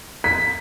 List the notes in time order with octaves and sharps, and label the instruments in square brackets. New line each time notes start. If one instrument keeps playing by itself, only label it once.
[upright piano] B6